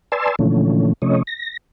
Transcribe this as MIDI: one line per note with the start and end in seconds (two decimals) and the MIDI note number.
0.12 0.35 71
0.12 0.35 74
0.12 0.35 80
0.12 0.35 81
0.12 0.35 84
0.12 0.35 88
0.39 0.93 46
0.39 0.93 50
0.39 0.93 52
0.39 0.93 53
0.39 0.93 57
0.39 0.93 61
1.02 1.23 48
1.02 1.23 53
1.02 1.23 57
1.02 1.23 61
1.02 1.23 73
1.02 1.23 75
1.27 1.57 94